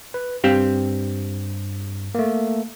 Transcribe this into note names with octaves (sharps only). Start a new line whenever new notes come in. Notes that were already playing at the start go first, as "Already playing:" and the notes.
B4
G2 C4 G4 F5
A3 A#3